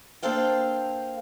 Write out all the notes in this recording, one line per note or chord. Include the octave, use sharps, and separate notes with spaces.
A#3 D4 A4 C5 F5 G5